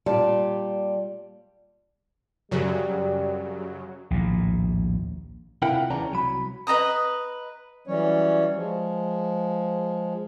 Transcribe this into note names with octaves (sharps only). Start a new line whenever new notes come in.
A#2 G3 G4 D5 A5
F#2 C#3 F#3 G3
A#1 D#2 A2
C3 E4 F4 A#4 F#5 G5
D2 C#3 E3 C#4 D4 A#5
C2 F#3 B5
B4 D#5 A#5 D#6
E3 F#3 G3 C#4 C#5
F3 G#3